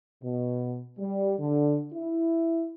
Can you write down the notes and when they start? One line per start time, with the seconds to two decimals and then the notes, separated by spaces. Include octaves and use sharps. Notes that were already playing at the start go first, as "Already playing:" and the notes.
0.22 B2
0.99 G3
1.39 D3
1.94 E4